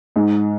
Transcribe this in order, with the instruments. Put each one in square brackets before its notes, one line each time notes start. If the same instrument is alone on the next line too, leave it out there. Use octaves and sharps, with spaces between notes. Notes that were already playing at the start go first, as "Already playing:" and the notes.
[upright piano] G#2